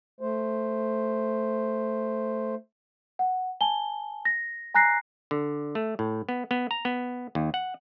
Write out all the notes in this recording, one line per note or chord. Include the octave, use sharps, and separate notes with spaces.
A3 C5
F#5
G#5 A5 G7
A#6
G#5 A#5 F#6 A#6 C7
D3
A3
A2
B3
B3
A#5
B3
D#2
F#5